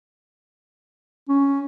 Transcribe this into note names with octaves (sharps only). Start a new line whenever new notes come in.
C#4